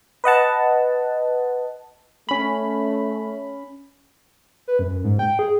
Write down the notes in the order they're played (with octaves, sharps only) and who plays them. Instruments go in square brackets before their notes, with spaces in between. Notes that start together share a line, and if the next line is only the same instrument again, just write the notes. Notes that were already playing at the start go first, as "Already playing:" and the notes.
[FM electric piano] B4 D#5 F#5 A5
[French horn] A3 [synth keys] C#4 B5
[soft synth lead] B4
F#2
G#2
G5
G#4